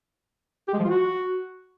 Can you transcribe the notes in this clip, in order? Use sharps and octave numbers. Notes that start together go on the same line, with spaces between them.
G4
G#3
F3
F4
F#4